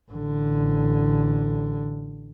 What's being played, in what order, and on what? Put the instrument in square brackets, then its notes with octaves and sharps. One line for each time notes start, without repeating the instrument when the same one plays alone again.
[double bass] A1 D3